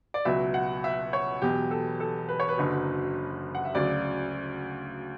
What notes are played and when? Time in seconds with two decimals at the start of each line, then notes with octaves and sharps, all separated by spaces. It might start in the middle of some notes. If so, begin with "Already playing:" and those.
0.14 D5
0.25 C#2 B2 F#3 E5
0.54 F#5
0.84 E5
1.13 C#5
1.41 E1 E2 B2 F#3 G4
1.71 A4
2.00 A4
2.29 B4
2.40 C#5
2.49 B4
2.58 F#1 F#2 D3 F#3
3.55 F#5
3.65 E5
3.75 D2 C#3 F#3 D5